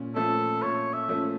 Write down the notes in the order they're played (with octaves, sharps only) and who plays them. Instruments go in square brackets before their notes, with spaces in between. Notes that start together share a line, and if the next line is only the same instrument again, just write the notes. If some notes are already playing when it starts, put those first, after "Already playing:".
Already playing: [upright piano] A#2 C#4
[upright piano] F3 A3 C#4 [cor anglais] A4
[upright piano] A#2 [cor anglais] C#5
[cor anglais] E5
[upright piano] F3 A3 C#4